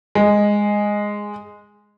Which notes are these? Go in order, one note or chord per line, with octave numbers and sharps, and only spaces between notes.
G#3